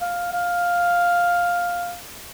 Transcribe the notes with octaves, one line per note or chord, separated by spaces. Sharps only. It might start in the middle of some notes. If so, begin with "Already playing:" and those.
F5
F5